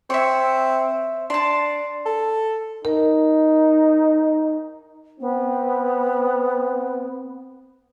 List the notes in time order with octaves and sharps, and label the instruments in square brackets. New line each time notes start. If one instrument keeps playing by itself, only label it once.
[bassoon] C4 [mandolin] C#5 E5
[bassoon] D4 [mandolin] A5 C6
[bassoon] A4
[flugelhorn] D#4 [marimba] A#4
[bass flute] B3 [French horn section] C4